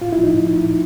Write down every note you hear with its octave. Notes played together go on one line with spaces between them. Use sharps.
A2 F4
E4
F3
D#4
A2